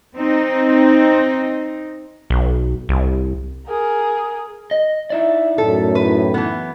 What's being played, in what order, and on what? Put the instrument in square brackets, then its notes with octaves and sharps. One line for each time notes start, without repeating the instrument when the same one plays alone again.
[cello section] C4 D#4
[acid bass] B1
C2
[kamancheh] G#4 A#4
[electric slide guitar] D#5
[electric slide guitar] D#4 E4 D5 [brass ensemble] E5
[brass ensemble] F#2 A2 [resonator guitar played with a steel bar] A4
[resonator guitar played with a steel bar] B4
E3 B3